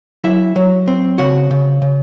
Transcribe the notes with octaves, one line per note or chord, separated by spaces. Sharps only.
F#3 E4 E5
F#3
C4
C#3 F#4 F#5
C#3
C#3